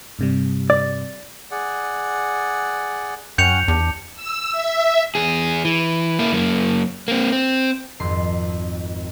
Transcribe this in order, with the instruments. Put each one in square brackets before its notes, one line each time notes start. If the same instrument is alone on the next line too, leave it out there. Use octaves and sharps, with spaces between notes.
[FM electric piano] G2 C3 G3
[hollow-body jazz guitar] D5
[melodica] G#4 D5 F#5
[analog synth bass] F#2 [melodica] C#4 F#5 G5 [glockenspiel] G6 C#7 F7
[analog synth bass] E2 [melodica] D4 G4
[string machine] E6
E5
[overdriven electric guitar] E2 G#4
E3
A#3 E4
F#2 A#3
A#3 C4
C4
[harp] G#1 F2 C6